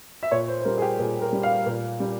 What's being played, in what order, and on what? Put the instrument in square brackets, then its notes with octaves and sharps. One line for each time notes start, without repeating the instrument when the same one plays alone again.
[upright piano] E5
A#2 C#5
C5
C5
G3 A#4
G#4
G4
A#2 G#4
A#4
G3
F5
A#2
G3